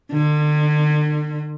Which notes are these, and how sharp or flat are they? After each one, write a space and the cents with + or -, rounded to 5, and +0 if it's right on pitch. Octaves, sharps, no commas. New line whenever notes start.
D3 +40